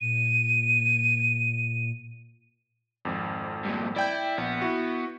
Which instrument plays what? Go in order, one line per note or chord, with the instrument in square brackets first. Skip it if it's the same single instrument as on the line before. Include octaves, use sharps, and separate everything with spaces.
[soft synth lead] A#2 [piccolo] D#7
[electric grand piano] G#1 F2
[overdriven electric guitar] G2 A#2
[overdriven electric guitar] E4 [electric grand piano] D5 G5 G6
[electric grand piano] A#1 [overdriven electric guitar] B3
[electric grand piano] E4 F#4